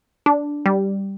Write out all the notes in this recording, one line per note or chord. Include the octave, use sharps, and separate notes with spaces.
D4
G3